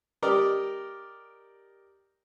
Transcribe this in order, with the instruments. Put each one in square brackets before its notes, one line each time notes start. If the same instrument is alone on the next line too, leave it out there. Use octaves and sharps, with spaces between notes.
[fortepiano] G4 A#4 D5 D#5